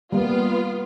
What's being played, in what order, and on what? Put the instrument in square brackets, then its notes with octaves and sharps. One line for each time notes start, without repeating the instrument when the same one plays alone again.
[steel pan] G3 A#3 [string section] B3 F4